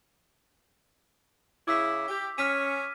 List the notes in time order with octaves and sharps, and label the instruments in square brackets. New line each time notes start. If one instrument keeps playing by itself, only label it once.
[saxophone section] C#3 E4 [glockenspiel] D6 E6 B6
[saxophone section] G4
[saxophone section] C#4 [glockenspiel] F6 B6 D#7